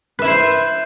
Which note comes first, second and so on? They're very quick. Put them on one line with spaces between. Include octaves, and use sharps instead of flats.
B4 E5 E4 C5